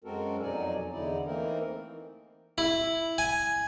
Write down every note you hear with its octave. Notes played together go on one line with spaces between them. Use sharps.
F#2 G#3 C4 F#4 A4 A#4
F2 B2 F#3 D#4 D5 G#5
E2 D3 D#4 E4 D5
E3 A3 A#3 C4 D#4 A#4
E4
G#5